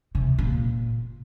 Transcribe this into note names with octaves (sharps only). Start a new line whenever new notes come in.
C3
A#2